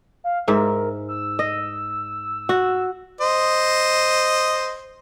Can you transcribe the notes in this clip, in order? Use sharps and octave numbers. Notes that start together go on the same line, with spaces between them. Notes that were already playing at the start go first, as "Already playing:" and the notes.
F5
G#2 A#4 E5
E6
D#5
F#4
C5 D#5